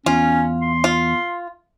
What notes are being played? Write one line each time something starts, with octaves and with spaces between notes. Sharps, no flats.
E2 C#4 F4
C6
F4